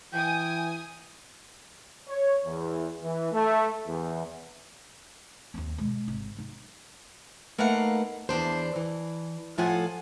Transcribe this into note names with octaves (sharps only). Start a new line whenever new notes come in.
E3 G5 G#5 D#6
C#5
E2
E3
A3
E2
D#2 C4
B2 G#3
G#1 C3
D#4
A3 A#3 D#4 B4 F5 F#5
E2 B2 D4 C5
E3
A2 F3 F4 A4 F#5 G#5